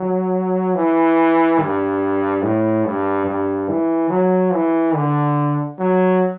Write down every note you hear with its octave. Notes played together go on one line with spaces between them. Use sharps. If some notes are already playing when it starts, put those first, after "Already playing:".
Already playing: F#3
E3
G2
A2
G2
G2
E3
F#3
E3
D3
F#3